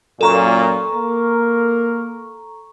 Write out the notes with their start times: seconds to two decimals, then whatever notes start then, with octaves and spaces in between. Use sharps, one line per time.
0.21 F#2 A#2 A4 A#5 C#6
0.92 A#3 A#4